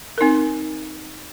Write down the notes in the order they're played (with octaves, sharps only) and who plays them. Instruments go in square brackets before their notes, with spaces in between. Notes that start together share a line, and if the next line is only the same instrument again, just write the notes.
[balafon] C4 D#4 A#4